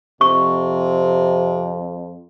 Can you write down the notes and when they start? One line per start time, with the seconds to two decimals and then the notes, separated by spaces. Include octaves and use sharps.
0.21 F2 C3 C#6